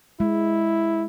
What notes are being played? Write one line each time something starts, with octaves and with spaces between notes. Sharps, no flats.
G#3 E4